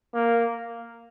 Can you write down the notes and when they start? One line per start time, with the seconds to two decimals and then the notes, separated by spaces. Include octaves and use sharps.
0.14 A#3